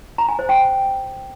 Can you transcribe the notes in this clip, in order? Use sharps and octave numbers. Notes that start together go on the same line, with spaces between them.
A#5
G#5
C5
G5